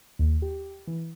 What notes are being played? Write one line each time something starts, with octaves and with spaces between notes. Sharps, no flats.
D#2
G4
E3